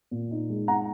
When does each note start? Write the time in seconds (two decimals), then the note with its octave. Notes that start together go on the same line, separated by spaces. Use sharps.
0.11 A#2
0.31 D#4
0.49 G#3
0.68 D#4 F#5 A#5